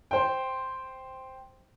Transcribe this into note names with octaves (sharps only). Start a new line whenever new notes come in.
C5 G5